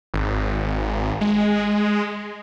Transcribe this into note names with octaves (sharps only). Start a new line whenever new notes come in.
G#1
G#3